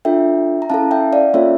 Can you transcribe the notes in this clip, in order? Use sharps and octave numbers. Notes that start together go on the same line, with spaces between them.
D4 F4 A4 E5 G5
A#5
C#4 E4 A4 F5 A5
E5 G5
D5 F5
A#3 C#4 F4 A4 C#5 E5